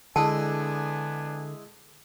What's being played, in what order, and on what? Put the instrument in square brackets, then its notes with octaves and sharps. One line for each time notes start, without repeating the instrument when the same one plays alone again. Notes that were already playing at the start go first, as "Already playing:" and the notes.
[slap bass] D3 [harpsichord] G#3 E4 [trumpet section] B3 D4 G#5 [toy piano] A5